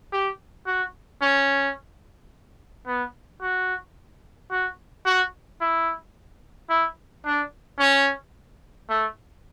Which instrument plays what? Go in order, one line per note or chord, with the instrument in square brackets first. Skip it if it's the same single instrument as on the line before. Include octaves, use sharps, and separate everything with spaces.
[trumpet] G4
F#4
C#4
B3
F#4
F#4
F#4
E4
E4
D4
C#4
A3